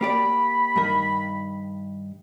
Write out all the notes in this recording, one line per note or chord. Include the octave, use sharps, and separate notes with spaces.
A#3 G4 D5 B5
G2 D#3 A#4